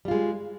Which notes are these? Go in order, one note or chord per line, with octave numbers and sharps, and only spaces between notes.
G3 G#3 F4